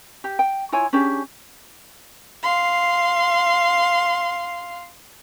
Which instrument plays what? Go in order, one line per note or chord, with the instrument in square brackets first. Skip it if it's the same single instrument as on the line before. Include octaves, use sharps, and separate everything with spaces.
[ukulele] G4
G5
E4 F4 C#5 G#5
C#4 D4 G4 G#4
[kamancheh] F5 C6